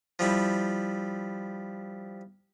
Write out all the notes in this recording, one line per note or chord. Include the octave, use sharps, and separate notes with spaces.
F3 G3 E4